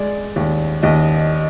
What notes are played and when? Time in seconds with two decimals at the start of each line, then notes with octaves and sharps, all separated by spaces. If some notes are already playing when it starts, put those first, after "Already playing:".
Already playing: G#3 D5
0.36 D#2
0.83 D#2 D#5